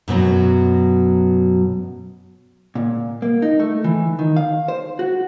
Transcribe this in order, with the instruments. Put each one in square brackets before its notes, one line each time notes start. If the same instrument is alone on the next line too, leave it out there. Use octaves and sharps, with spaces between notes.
[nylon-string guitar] F#2 B2 E3 F#3
[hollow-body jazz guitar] A#2
A#3
D#4
A3
E3
D#3
F5
C5
F#4